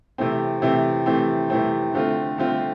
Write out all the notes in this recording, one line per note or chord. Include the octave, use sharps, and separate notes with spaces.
C3 E3 A3 C4
C3 E3 A3 C4
C3 E3 A3 C4
C3 E3 A3 C4
D3 A3 C4 F4
D3 A3 C4 F4